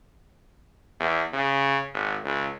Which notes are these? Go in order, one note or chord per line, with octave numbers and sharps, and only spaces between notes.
E2
C#3
G#1
C#2